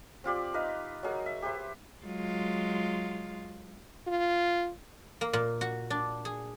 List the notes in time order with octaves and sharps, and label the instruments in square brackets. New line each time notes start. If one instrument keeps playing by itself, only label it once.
[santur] C4 F4 G4 D5
D#4 B4 D#5 F5
F#3 D#4 G#4 A#4
E5
G4 B4 C5 E5
[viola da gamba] F#3 G#3 F4
[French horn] F4
[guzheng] A#3
A#2
F#4
D4
G#4